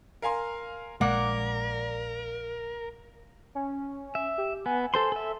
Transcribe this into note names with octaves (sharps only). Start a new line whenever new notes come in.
A#4 F5 G#5 C6
A#1 A#2 G#3 A#3 A#4 D5 F#5
C#4
E5
G4
B3 G#5
A4 C5 C6
A4 E5